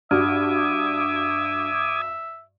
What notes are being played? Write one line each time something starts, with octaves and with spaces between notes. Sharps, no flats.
G2 D4 F#4 E5 D6 D#6 F6 G#6